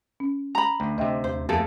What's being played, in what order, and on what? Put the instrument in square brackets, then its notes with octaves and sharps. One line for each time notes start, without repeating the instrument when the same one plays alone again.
[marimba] C#4
[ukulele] A#5 B5
[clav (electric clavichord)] D2 [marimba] A3
[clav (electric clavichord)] D2 C3 [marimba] D#5 E5 G5
[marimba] D#2 [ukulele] C5
[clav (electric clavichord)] F2 A3 A#3 [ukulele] G#4 A4